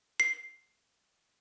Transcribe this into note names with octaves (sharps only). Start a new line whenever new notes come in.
C7